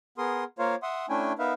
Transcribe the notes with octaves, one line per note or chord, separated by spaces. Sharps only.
B3 G#4 A#4 C6 D#6
A#3 F4 A#4 C5 C#5 F5
E5 F#5 C6 D#6
A3 C#4 D4 E4 G5 G#5
B3 D#4 A#4 B4 E5 F5